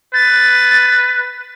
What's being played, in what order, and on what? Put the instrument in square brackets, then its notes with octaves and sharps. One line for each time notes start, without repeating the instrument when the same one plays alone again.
[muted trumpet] B4 [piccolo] A6